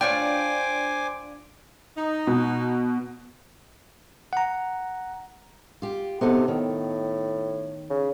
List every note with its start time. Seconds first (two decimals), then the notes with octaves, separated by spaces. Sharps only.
0.01 D4 F4 C5 C#5 G5 G#5 D6
1.97 D#4
2.27 B2
4.33 F#5 A#5
5.82 F4 G4
6.21 C3 B3 D#4 A4
6.48 A2 D#3
7.90 C#3